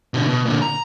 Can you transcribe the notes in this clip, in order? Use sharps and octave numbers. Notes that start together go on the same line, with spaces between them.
B2 D3
B2
A#2 D3
A#5